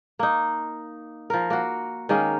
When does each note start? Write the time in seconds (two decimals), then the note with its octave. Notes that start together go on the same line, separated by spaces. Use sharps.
0.19 A#3 D#4
1.30 F3 A#4
1.50 A#3 F#4
2.09 D#3 G#3 A#3 C#4